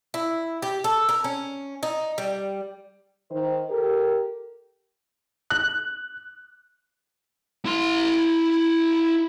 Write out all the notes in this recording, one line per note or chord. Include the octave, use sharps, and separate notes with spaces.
E4
G4
A4
A#4
C#4
D#4
G3
D#3 C5
G4 A4 A#4
F#6
E4 C6